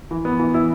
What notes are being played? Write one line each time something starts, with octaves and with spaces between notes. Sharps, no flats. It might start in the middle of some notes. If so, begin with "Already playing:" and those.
E3
B3
E3
E4